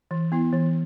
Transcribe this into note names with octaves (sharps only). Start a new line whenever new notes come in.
E3
B3 E4
E3